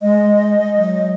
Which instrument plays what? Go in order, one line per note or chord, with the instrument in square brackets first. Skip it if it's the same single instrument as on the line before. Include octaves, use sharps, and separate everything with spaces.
[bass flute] G#3 [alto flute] D#5
[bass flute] F#3